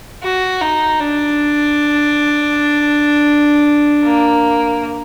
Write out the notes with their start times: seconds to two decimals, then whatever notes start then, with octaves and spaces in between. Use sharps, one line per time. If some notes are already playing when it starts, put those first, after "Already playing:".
0.23 F#4
0.61 D#4
1.00 D4
4.04 A#3